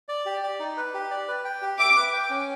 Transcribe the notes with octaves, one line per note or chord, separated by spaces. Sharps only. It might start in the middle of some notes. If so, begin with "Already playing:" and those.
D5
G4
D5
D#4
B4
G4
D5
B4
G5
G4
E5 D6
B4
G5
C#4